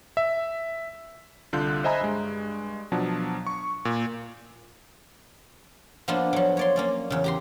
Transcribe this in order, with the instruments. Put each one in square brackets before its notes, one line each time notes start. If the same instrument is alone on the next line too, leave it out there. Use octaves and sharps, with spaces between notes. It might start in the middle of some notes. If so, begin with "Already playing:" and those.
[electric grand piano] E5
C2 D3 F4 F#6 G6
C5 D#5 E5 G#5 A#5 B5
G2 G#3
B2 F3 F#3 D4
C#6
A#2
[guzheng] F3 A#3 B3 D4 F4
F3 F#3
C#5 D5 C6
A#3 C#4 D5
E2 C#3
G4 A#5 C6